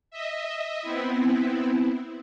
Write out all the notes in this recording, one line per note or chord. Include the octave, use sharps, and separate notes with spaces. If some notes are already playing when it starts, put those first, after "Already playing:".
D#5 E5
B3 C4 E4